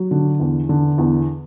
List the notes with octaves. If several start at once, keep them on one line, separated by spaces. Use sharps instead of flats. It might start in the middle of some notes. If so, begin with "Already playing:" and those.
Already playing: F#3
D3
E2
D3
E2